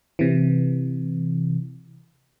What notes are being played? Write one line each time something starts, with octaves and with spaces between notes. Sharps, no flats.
C3 E3